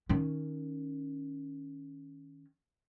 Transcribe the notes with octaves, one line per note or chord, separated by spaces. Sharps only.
D#3 C#4